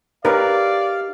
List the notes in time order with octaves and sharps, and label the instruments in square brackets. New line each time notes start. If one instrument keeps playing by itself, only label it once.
[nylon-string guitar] D#4 G4 C#5 [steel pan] A#4 B4 [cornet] D5 [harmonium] F5